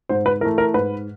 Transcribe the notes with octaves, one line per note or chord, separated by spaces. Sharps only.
G#2 C5
B4
E3 A3 A#4
A#4
G#2 B4